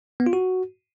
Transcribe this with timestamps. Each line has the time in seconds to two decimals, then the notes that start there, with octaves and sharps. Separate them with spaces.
0.20 B3
0.26 F4
0.33 F#4